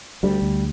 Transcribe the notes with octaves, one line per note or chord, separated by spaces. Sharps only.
D2 G3
D2